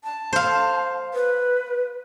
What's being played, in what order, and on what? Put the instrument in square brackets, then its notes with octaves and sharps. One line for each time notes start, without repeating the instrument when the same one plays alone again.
[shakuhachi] A5
[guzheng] C5 F5
[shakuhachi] B4